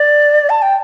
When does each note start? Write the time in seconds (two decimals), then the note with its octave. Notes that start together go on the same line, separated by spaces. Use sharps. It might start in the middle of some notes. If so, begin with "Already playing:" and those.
Already playing: D5
0.50 A5
0.62 G5